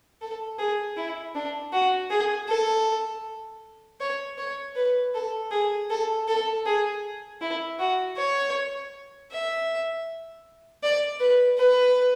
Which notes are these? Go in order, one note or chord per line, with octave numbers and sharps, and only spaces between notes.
A4
G#4
E4
D4
F#4
G#4
A4
C#5
C#5
B4
A4
G#4
A4
A4
G#4
E4
F#4
C#5
E5
D5
B4
B4